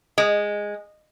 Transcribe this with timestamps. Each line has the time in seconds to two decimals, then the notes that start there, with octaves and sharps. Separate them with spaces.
0.18 G#3